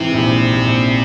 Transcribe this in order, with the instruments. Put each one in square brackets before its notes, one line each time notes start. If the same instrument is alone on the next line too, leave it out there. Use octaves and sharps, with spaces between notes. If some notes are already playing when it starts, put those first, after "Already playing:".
Already playing: [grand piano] G#2 E3 [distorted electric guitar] C3
[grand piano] A#1
A#1